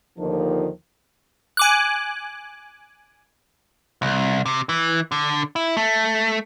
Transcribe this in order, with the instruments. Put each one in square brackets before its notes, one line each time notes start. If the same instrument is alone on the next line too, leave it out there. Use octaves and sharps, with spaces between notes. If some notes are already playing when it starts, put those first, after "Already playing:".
[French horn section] D#2 D3 D#3 F3
[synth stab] G#5 D6 F#6
[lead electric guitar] C2
C3
E3
D3
E4
A3